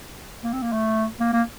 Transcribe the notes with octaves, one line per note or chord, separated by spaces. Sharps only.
A#3
C4
A#3
A3
A#3
A#3